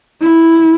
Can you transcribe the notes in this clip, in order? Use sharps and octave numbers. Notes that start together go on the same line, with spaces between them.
E4